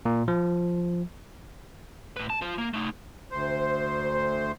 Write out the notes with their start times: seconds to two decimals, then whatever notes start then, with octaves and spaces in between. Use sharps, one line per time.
0.05 A#2
0.28 F3
2.17 A2 B4
2.30 A5
2.42 F4 C5
2.58 A#3
2.74 A3 D#4
3.31 D2 C5